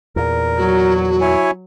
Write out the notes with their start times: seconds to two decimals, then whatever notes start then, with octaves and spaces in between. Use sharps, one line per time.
0.16 E2 A#2 A#4
0.58 F#3 F#4
1.21 E4 C#5 G#5